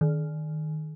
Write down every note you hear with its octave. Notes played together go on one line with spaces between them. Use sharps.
D#3